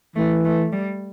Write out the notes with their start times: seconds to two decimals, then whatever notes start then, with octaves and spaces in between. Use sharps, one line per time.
0.16 E3 A3
0.45 A3
0.72 G3